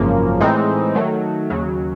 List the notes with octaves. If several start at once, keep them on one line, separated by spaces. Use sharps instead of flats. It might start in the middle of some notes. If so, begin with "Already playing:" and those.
Already playing: G#1 F#2 C#3 F3 A#3
A2 E3 G#3 C4 D#4
D#3 F#3 A3
D#2 C#3 F#3